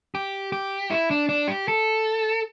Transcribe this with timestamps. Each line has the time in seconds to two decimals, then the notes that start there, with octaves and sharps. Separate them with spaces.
0.15 G4
0.52 G4
0.90 E4
1.11 D4
1.29 D4
1.48 G4
1.68 A4